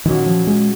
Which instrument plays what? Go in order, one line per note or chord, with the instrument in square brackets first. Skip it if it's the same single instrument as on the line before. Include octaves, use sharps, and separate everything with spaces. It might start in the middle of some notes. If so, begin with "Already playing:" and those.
[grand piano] A#2 F#3 C#4 F#4 [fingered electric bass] D#3
[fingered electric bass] F3
G#3